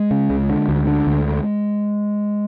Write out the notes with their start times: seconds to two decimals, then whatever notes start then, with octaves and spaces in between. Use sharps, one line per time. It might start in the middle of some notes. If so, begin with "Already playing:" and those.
Already playing: G#3
0.11 C#3
0.30 C#2
0.49 D3
0.68 D2
0.87 D3
1.07 D2